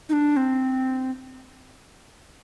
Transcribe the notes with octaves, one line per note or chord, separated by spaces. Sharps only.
D#4
D4
C4